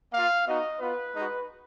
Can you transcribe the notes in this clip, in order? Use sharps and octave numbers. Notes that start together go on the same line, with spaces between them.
A#3 F4 F5
B3 D#4 F#4 D#5
B3 F4 B4
G#3 D#4 F#4